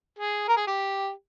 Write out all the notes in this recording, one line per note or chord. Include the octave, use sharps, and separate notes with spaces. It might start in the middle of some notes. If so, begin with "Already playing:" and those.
G#4
A#4
G#4
G4